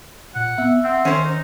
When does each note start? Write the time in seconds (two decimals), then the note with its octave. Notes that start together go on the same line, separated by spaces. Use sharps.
0.35 A#2 F#5
0.58 B3 E5
0.84 C4 F#5
1.05 D#3 C#4 C5
1.24 D#4